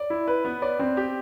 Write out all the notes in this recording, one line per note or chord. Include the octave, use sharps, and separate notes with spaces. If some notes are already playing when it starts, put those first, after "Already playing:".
Already playing: D5
E4
B4
B3
D5
C4
G4